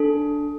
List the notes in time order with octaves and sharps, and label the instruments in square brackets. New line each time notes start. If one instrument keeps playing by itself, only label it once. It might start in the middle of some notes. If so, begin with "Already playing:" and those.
Already playing: [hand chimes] D4 A4